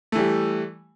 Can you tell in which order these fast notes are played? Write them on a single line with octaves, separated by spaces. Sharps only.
A3 E3 G3